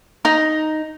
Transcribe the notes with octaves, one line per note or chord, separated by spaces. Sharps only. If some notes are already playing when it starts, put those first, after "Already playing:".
D#4 A#5